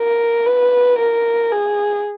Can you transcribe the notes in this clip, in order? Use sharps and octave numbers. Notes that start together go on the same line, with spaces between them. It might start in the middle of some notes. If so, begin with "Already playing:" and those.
Already playing: A#4
B4
A#4
G#4